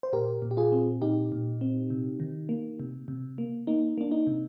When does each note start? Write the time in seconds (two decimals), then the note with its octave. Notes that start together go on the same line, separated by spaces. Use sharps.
0.03 C5
0.13 A#2 G4 A#4
0.42 A#2
0.51 G4
0.57 F4 G#4
0.72 C4
1.01 A#2 D#4 G4
1.32 A#2
1.61 C4
1.90 C3
2.20 D#3
2.49 A#3
2.80 C3
3.08 C3
3.38 A#3
3.67 A#3 D#4
3.98 A#3 D4
4.11 D#4
4.27 C3